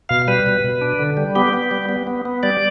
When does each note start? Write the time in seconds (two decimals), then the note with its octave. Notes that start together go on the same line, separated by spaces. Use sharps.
0.09 B2 F5
0.28 G3 B4
0.46 B2
0.64 B2
0.81 D4
0.99 D3
1.17 G3
1.35 B3 G4
1.53 B3
1.71 G3
1.89 B3
2.07 B3
2.25 B3
2.43 G3 D5